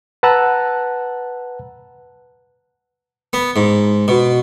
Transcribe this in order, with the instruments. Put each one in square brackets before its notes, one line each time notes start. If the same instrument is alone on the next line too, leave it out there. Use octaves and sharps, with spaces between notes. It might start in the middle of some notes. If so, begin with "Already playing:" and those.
[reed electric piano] B4 F#5 A5 A#5 E6 F#6
[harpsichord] B3
G#2
B2